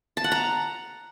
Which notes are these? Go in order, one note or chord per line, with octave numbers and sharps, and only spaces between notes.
A5
F#5
A#5